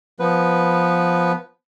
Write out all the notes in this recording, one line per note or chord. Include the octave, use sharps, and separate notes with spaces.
F3 B3 B4